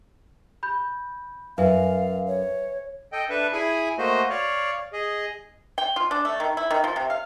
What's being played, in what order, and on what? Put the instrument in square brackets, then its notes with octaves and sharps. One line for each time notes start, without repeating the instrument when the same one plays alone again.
[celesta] B5 G6
[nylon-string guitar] F#2 [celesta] B4 E5 G#5 [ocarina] F5
[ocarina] C#5
[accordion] A4 D#5 G5
D4 A4 B4 E5
E4 G#4 G#5 B5
A3 A#3 F#4 C5 D#5
C#5 D5 F5
G#4 D#5
[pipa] G5
F4
D4
A3
D#3
E4
D#3
F3
C3
F5